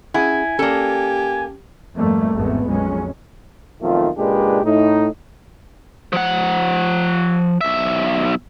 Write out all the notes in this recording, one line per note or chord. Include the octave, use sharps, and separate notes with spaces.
C#4 E4 G#4 F#5 G#5
A#3 C#4 G4 A4 D5
F2 G#2 G3 A3 A#3
G#1 E2 G#3 A3 B3 C4
A#1 F2 F#3 G#3 C#4
B1 F2 D#3 A3 F4
C#2 A#2 G#3 D4 G4 B4
A2 D#4
F3 F#5
B1 E5